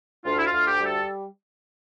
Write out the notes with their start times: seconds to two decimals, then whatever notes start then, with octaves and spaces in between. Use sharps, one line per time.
0.25 D2 F4
0.38 E4
0.45 F4
0.52 D2
0.66 G4
0.79 G3
0.85 A4